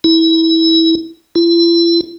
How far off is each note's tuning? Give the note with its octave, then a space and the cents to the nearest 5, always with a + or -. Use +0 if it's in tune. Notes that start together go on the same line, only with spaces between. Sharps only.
E4 -20
E4 +45